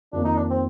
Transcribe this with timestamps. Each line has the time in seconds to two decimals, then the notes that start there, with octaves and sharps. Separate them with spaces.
0.13 F2 D#3 A#3 D4
0.25 D#4
0.37 D4
0.50 C4